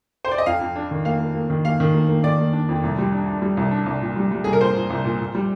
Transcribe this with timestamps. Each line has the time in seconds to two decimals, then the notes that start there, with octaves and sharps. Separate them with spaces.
0.25 C5
0.32 D5
0.38 D#5
0.46 F2 F5
0.61 F2
0.76 D4
0.91 D#3
1.05 A#3 F5
1.20 A#3
1.35 A#3
1.50 D#3
1.65 A#3 F5
1.80 D#3
1.94 A#3
2.08 A#3
2.23 D#3 D5
2.38 A#3
2.53 D4
2.69 F2
2.83 C2
2.98 G3
3.12 D4
3.28 D4
3.42 G3
3.57 C2
3.71 D4
3.86 C2
4.01 A#2
4.16 G3
4.31 G3
4.44 C2 G#4
4.53 A#4
4.60 A#2 C5
4.75 A#2
4.90 C2
5.05 A#2
5.20 A#2
5.35 G3